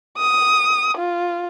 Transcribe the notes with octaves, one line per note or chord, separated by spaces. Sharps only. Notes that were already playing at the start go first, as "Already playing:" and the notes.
D#6
F4